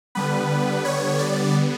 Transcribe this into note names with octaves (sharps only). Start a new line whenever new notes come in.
D3 G3 B3 B4
C#5
D5